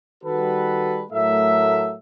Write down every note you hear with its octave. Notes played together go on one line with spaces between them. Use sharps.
D#3 G3 F#4 A4 B4
A2 F#3 A3 A#4 E5